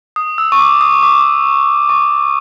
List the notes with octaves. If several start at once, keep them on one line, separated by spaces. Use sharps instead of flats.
D#6
E6
C#6
D6
D#6
D6
C#6